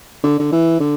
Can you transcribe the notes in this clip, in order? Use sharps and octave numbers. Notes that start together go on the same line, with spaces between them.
D3
D3
E3
D3